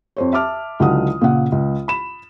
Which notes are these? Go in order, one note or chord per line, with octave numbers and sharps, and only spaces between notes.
F2 C5 C#5
E5 A5 D6 F6
C#2 D3 F#3 E4 F#5 D#6
A#2 C#3 F#5
C#2
B5 E7